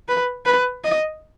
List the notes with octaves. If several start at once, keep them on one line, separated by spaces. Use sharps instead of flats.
B4
B4
D#5